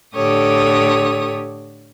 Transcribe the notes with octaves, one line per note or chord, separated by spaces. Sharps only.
A2 D3 G4 A4 C#5 D#6